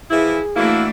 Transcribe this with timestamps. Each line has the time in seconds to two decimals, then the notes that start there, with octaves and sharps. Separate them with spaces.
0.11 E3 F3 E4 G#4
0.56 E3 A3 A#3 D4 E4 F#4